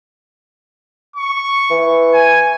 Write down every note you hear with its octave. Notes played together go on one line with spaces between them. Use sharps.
C#6
E3
G#5